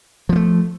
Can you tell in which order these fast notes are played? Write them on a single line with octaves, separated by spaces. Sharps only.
F3 A#3 A3